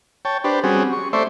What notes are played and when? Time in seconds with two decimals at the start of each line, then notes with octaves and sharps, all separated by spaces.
0.25 C#5 G5 A5
0.44 D4 G4 B4 C5
0.64 G3 C4 C#4 F#4 G#4
0.93 C#6
1.13 A3 C5 D5 E5 C6 C#6